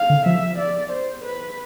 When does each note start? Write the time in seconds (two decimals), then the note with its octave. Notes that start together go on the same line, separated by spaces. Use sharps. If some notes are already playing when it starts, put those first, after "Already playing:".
Already playing: F5
0.10 D3
0.26 F3 E5
0.59 D5
0.93 C5
1.25 B4